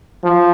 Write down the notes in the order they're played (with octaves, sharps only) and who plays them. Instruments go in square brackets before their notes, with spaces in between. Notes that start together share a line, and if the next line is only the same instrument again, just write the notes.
[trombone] F3